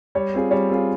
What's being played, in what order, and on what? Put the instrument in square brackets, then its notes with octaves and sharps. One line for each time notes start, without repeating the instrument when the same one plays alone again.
[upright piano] G3 [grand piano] C#5
[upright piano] C4 F4 G#4
[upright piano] G3 [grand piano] C#5
[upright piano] C4 F4 G#4